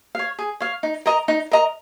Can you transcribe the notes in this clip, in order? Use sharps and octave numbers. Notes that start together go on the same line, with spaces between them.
C#5 F5
G#4
C#5 F5
D#4
A#4 D#5 A#5
D#4
A#4 D#5 A#5